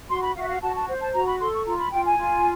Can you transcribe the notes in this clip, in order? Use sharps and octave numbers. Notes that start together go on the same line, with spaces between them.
F#4 C6
B5
F#4 F5
E5
F5
F#4 A5
A5
C5
A5
F#4 A#5
B5
A4 C6
C#6
F4 A#5
B5
F4 G5
G#5
F4